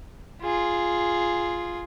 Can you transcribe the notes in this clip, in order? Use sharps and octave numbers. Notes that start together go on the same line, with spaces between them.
F4 G#4